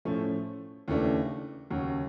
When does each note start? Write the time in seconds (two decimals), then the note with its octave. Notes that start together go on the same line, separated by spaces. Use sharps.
0.05 A2 F3 A3 C#4
0.88 D#2 C#3 E3 A3 D4
1.70 D#2 C#3 F#3